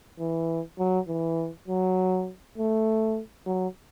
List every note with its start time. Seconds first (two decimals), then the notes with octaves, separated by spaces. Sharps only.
0.19 E3
0.78 F#3
1.08 E3
1.68 F#3
2.58 A3
3.46 F#3